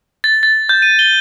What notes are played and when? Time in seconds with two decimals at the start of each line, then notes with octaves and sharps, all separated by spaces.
0.24 A6
0.43 A6
0.69 G6
0.82 D#7
0.99 G7